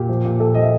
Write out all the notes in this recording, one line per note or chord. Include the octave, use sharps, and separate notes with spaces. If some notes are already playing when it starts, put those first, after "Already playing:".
Already playing: A#2 G4
F3
A#2
A#2 A4
F3 D#5
E5